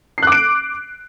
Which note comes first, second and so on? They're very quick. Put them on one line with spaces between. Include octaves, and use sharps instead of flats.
C7 F#6 D6 D7